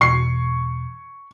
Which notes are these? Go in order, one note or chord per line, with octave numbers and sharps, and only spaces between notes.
E1 C#6 C7